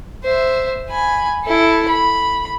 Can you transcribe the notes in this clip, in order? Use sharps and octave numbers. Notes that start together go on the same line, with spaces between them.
C5 E5
G#5 B5
E4 A4
B5